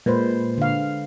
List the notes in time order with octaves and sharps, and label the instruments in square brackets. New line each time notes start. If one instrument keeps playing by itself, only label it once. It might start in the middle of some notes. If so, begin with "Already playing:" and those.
[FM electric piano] A#2 [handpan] G#3 B4 C5
[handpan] D3 F5